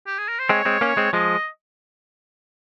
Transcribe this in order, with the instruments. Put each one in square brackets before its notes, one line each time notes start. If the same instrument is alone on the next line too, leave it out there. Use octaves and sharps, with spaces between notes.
[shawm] G4
G#4
A#4
C5
[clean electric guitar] G#3 C4 [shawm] C#5
[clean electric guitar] G#3 C4
A#3 C#4
G#3 C4
[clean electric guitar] F3 G#3 [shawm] D#5